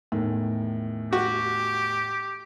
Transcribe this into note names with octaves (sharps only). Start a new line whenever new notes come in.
E2 A2 D#3
F#4 G4